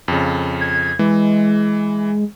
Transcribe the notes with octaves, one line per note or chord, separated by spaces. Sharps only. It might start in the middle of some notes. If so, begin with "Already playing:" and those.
F2 C#3
G#6
E3 G#3